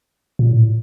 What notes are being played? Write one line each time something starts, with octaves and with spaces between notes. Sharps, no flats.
A#2
A2